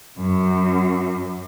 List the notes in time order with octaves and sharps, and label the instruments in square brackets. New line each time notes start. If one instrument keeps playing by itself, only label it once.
[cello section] F#2